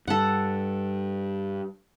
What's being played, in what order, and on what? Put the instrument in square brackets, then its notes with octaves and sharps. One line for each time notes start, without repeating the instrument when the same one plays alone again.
[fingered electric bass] G2 G3 [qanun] A4 F#5